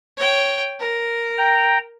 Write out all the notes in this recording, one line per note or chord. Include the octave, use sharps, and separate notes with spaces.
C#5 G5
A#4
G5 A#5